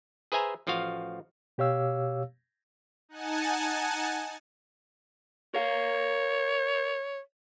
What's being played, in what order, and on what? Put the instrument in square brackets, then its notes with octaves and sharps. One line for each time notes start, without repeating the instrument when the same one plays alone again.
[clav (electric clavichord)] G#4 B4 C5 E5 G#5 A#5
A1 F3 F4 F#4 F5
[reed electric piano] B2 G4 C#5 F5 E6
[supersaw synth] D#4 F#5 G#5 A5
[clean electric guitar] A#4 F5 [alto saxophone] C#5